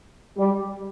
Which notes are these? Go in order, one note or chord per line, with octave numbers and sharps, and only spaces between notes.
G3